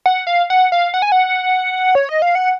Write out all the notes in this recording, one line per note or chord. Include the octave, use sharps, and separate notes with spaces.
F#5
F5
F#5
F5
F#5
G#5
F#5
C#5
D#5
F5
F#5